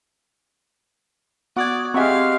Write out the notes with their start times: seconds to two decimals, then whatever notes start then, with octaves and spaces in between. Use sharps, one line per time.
1.56 B3 F#4 D5 D#6 G#6
1.94 G#3 C4 F#4 G4 E5 F5 C#6